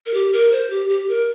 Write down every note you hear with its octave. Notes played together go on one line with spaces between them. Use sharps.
A#4
G4
A#4
C5
G4
G4
A#4